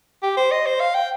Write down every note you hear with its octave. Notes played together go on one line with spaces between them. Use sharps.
G4
C5
D#5
C5
F5
G5